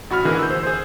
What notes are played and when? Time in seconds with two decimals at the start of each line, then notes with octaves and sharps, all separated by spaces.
0.10 A1 F#4 B5 F6
0.25 D3 E3 A#3 G#4 A#4
0.39 E6 G6
0.50 C5
0.63 G#4 C5